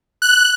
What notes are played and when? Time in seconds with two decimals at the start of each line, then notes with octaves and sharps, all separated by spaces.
0.22 F#6